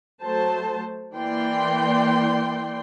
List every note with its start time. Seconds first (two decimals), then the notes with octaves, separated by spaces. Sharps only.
0.22 F#3 A3 C5 A5
1.14 E3 A#3 D5 G5 C6